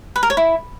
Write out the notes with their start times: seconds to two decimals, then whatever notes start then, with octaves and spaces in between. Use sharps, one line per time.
0.16 B4
0.23 A#4
0.30 C#5
0.37 E4